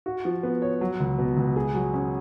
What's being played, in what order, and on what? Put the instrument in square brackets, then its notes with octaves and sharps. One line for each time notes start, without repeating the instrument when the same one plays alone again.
[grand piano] F#4
F3
B3
C#5
F#3
C#2
B2
C#2
G#4
F#3
C#4